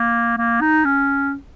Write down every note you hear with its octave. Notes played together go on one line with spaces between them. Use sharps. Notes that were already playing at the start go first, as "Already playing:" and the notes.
Already playing: A#3
A#3
D#4
C#4